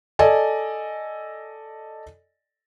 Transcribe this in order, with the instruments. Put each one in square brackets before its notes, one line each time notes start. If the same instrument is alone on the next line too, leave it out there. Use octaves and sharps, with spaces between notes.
[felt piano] A4 D5 D#5 G#5